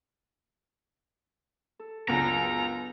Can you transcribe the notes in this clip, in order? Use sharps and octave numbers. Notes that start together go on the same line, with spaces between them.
A4
C#2 F#2 B3 D4 A#5